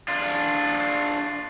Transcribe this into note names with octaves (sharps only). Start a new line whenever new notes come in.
D4 F4